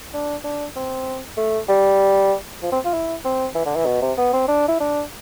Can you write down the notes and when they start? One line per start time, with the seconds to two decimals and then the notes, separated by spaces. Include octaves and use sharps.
0.14 D4
0.44 D4
0.76 C4
1.37 A3
1.69 G3
2.63 F3
2.72 C4
2.85 F4
2.93 E4
3.25 C4
3.55 E3
3.65 D3
3.75 E3
3.86 B2
4.02 C3
4.18 B3
4.33 C4
4.48 D4
4.68 E4
4.80 D4